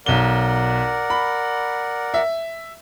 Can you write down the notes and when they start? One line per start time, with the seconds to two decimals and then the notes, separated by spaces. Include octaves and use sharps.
0.06 B1 A#4 D5 F#5 G7
1.10 B5
2.14 E5